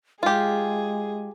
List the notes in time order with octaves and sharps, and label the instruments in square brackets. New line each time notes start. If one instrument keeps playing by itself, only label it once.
[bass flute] G#3 [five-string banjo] F4 G4 [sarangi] G#4